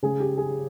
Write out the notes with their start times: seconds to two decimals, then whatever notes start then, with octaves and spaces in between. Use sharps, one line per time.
0.03 C#3 G#3 G#4
0.20 G4
0.38 G#4